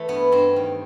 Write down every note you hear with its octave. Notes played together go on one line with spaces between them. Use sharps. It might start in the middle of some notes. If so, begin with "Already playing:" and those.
Already playing: E3 A3
G2 B3
G2 C4
D#3